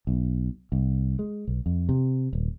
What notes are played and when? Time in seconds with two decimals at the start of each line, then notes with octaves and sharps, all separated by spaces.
0.07 B1
0.72 C2
1.19 G#3
1.48 B1
1.66 F2
1.89 C3
2.33 D#1